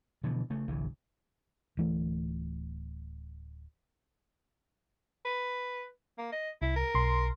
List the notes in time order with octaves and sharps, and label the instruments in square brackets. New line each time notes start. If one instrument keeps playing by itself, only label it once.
[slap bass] B2 D3 E3 F3
C#3 A3
G1 C2 G2 E3
[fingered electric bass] D1 E3 A3
[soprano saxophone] B4
A#3
D#5
[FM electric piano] C2 [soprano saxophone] E4
[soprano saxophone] A#4
[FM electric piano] B1 C6